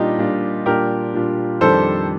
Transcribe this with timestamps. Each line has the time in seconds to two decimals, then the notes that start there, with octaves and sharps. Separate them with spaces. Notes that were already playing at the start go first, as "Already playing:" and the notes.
Already playing: A#2 G3 D4 D#4 F4 G4
0.18 A#2 G3 D4 F4
0.66 A#2 G3 D4 F4 G4 A#4
1.14 A#2 G3 D4 F4
1.61 F2 D#3 G3 D4 A4 C5